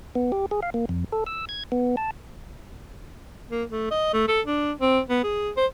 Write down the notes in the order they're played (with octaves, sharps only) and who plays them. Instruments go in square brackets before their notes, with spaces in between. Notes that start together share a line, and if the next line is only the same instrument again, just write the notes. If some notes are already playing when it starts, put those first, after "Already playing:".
[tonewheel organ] B3
G4
G#4
F5
A#3
F2
A4
E6
G#6
B3
A5
[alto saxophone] A#3
A3
D#5
A3
A4
D4
C4
B3
G#4
C5